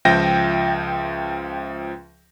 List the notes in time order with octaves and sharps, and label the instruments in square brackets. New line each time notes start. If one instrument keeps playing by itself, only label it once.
[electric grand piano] C#2 F3 E5 G5 G6 A#6